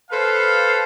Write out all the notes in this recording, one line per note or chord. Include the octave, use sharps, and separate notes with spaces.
A4 B4 C5 F5 A5